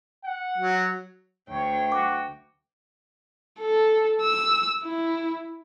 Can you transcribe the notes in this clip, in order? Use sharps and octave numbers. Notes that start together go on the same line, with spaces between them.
F#5
F#3
D2 C#5 G5
F#4 D6
A4
E6
E4